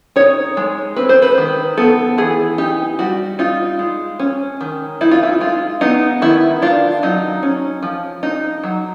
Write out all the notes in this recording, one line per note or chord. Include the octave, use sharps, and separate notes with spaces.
D#4 C#5
G#3
C4 B4
C5
B4
D#3
B3 A4
E3 G#4
D#4 G4
G3 F#4
D#4 F4
G#3
C#4
D#3
D#4 E4
F4
E4
G#3 F4
B3 D#4
D#3 E4
D4 F4
F#3 D#4
C#4
F3
D#4
F#3